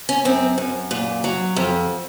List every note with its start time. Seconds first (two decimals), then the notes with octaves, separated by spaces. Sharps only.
0.09 C#4
0.25 F#2 C4
0.58 F#2
0.91 A#2
1.24 F#3
1.56 F2